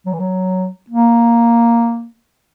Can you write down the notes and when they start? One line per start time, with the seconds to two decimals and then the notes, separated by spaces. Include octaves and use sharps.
0.06 F#3
0.13 E3
0.20 F#3
0.90 A#3